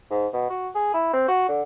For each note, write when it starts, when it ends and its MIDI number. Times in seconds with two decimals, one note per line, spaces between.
0.10 0.27 44
0.33 0.49 47
0.50 0.68 66
0.75 0.90 68
0.94 1.10 64
1.13 1.24 60
1.28 1.48 66
1.48 1.62 50